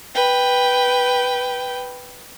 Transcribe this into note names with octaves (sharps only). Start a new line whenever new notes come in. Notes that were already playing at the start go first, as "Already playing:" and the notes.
B4 G5